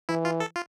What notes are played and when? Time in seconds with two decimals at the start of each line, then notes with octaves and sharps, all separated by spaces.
0.09 E3 E4
0.25 F4
0.40 A4
0.56 F4